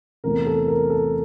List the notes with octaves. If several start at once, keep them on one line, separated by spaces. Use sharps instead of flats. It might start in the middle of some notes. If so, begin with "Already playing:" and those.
E2 C3 E3 A3 C4 A#4
A4
A#4
A4